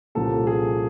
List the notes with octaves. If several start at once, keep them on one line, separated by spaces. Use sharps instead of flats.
C2 A#2 F3 A#3 C#4 A4
G#4